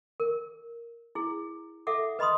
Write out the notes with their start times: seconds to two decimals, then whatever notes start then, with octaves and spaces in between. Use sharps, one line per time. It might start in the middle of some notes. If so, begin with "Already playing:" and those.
0.20 A#4
1.15 E4 G#4
1.87 A4 E5 F#5 D6
2.19 B4 D#5 B5 C6 D#6